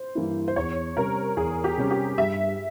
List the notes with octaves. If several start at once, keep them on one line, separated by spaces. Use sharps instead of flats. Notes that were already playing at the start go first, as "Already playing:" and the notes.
Already playing: C5
G2 E3 A#3 E4
C5
E2 C#5
C3 G3 C#4 A#4
E2 G#4
G4
C3 G3 C#4
G4
G2 E5